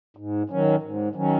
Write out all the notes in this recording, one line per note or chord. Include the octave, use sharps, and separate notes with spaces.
G#2
D#3 F#3 C#4
G#2
D#3 F#3 C#4